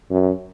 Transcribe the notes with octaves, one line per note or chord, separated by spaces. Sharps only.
F#2